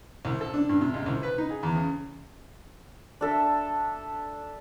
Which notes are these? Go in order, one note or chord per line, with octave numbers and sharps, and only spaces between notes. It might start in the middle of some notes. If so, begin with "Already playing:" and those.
C2
A4
D4
G2
C3
C#2
C2
B4
D#4
G#4
E2
C#3
D4 A4 E5